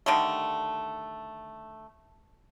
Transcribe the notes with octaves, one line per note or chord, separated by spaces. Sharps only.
D3 D#3 G3 A3